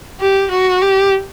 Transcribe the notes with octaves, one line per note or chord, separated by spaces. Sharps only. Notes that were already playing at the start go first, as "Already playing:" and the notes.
G4
F#4
G4